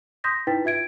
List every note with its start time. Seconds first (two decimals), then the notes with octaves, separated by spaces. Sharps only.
0.24 C6 D#6 G6 A#6 B6
0.47 D#4 E4 B4 G5 A6 B6
0.65 F4 E5 G#6 D7